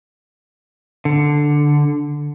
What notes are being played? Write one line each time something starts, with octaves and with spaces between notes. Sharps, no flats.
D3